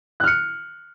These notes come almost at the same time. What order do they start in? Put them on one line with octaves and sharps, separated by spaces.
F#6 F6 C#7